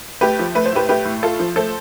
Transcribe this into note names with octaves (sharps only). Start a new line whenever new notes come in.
A3 G4 B4
F3
A3 B4
C5
A2 G4 B4
A3 G4 B4
A2
A3 F4 A4
F3
A3 A4 C5